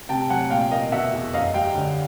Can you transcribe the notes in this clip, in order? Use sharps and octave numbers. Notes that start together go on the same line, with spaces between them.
C3 G5 A5
F#3 F#5 G#5
A#2 F5 G5
A#3 D#5 F5
B2 E5 F#5
E2
F#2 D#5 F5
G3 F5 G5
D3